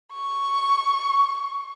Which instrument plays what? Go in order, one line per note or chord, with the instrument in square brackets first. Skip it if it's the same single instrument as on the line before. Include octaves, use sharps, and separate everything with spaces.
[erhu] C#6